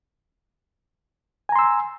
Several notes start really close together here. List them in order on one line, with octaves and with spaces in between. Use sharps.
G#5 A#5 C6 E6